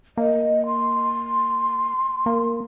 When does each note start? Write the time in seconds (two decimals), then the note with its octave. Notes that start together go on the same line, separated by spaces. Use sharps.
0.17 A#3 D#5
0.66 C6
2.26 A#3